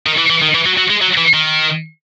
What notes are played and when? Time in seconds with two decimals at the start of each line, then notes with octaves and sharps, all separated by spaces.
0.07 D#3
0.18 E3
0.30 E3
0.42 D#3
0.54 E3
0.66 F#3
0.78 F#3
0.90 G#3
1.01 F#3
1.17 E3
1.34 D#3